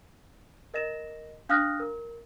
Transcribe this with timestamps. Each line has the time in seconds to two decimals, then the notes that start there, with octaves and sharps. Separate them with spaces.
0.74 A#4 D#5 A#6 E7
1.49 D4 F5 D#6 F6 F#6 A#6
1.80 A#4